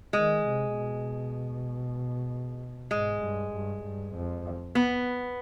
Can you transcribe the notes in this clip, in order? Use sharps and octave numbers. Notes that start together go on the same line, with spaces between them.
D#3 G#3
C3
B2
G#2 G#3
G2
G2
G2
F2
B3